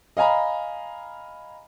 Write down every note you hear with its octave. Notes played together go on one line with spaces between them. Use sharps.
D#5 F5 G#5 A#5 B5